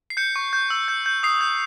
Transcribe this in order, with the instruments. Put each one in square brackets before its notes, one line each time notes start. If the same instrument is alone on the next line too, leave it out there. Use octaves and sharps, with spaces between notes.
[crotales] C7
G6 C#7
C#6
G6
E6
G6
G6
D#6 C7
G6